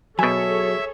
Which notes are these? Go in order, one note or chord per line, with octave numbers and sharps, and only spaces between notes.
B2 F#3 G#4 A4 C#5 E5 G#5